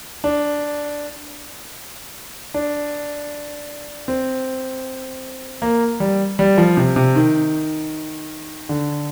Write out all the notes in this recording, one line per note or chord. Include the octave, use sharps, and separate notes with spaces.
D4
D4
C4
A#3
G3
G3
F3
C3
C3
D#3
D3